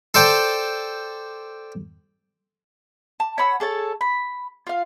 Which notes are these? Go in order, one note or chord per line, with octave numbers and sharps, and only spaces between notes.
A4 C5 D5 G5
A5
C#5 F#5 B5 E6
G#4 A4 C#5 A5
B5
F4 F5